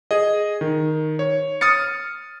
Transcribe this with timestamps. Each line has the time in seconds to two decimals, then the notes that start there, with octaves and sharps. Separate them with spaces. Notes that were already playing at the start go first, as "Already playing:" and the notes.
0.11 G#4 D#5
0.61 D#3
1.19 C#5
1.61 D#6 F6 A6 C#7